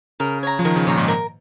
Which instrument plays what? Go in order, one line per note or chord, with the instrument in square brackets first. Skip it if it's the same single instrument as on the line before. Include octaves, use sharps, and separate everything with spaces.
[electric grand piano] C#3 [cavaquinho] A#4
[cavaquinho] C#5 A#5
[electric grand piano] F3
[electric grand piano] D#3 [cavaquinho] A#4
[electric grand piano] C#3
[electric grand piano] A#2 [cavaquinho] C#5 A#5
[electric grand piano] G#2
[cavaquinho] A#4